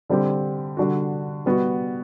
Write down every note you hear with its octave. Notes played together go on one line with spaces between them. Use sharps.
D3 G3 C4 G4
D3 G3 D4 F#4
G3 B3 F#4